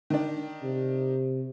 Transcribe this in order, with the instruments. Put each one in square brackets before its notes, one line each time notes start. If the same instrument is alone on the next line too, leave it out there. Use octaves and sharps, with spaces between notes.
[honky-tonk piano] D#3 D4
[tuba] C3